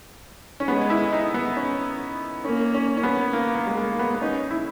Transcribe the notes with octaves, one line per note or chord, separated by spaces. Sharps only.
C#4
G#3 B3
E4
D#4
B3
C#4
A#3 C#4
C#4
C#4
B3
A#3
A#3
G#3
A#3
B3
B3
C#4 D#4
E4